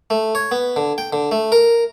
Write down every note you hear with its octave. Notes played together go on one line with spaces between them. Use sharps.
A3
C#5
B3
D3
G5
D3
A3
A#4